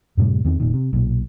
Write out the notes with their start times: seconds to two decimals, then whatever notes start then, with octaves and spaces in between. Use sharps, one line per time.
0.17 F#2 A2 C3 G3
0.44 E2 D#3 C4
0.60 F1 A#2 D#3
0.74 C3
0.93 B1 A#2